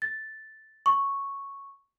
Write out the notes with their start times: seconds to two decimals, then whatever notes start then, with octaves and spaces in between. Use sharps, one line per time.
0.02 A6
0.86 C#6